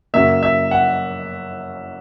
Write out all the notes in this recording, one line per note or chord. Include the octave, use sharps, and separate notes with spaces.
F#2 C#3 F#3 A#3 E5
E5
F#5